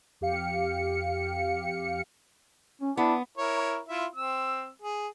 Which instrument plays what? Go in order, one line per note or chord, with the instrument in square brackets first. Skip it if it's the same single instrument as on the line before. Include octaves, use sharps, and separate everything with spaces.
[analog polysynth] F2 G4 F5 C#7
[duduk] C#4
[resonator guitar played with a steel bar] B3 [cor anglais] D4 [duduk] E4
[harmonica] E4 A#4 C#5
E4 F4 E5
C4 E6
G#4